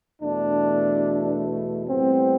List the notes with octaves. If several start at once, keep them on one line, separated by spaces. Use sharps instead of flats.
E2 B2 A3 D4
A2 G3 B3 C4